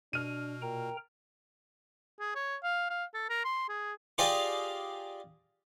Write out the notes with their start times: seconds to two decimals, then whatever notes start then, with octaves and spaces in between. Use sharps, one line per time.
0.13 B2 D4 F6 D#7
0.62 A#2 A#4 G5 A#5
2.20 G#4
2.35 C#5
2.63 F5
2.90 F5
3.14 A4
3.29 A#4
3.44 C6
3.69 G#4
4.18 F4 G4 G#4 D5 D#5 F5